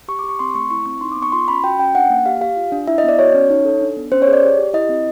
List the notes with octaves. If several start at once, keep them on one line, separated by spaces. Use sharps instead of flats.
G4 C#6
D6
G4
C#6
C4 C6
A3 C#6
E4 C#6
C4 C#6
D#4 C6
D6
B3
C#6
F4 C6
C#4 B5
F#4 G5
C#4 G5
D4 F#5
A#3
G4 F5
G4 F5
F4
D4
E4 E5
D#5
B3 D5
F#4 C#5
C#4
D#4
A4
D4
B3
C#4 C5
C#5
G#4
D5
G4
G4
E4 D#5
C4